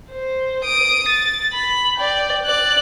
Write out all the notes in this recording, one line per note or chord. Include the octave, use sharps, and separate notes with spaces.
C5
D#6 D7
A6
B5
D5 G5
D5 F#6